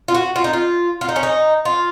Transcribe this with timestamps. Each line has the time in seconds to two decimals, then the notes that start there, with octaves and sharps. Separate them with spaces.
0.08 F4
0.14 F#4
0.36 F4
0.44 D#4
0.53 F4
1.01 F4
1.09 D#4
1.16 C#4
1.23 D#4
1.65 F4